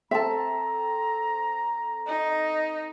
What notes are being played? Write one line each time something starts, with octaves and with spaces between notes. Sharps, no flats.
C4 A4 E5 A5 A#5
D#4